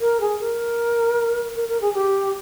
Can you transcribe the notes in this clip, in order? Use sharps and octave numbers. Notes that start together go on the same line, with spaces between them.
A#4
G#4
A#4
A#4
A#4
G#4
G4